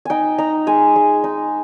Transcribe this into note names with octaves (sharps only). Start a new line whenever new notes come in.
D#4 G5 G#5
D#4 A#5
G#3 G#5
G#3
D#4